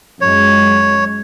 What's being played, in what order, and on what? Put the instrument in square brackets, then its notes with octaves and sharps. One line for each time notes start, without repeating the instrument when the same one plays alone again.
[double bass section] F#2 G#3 [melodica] C#5